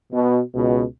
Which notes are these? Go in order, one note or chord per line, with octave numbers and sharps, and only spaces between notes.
B2
C#2 B2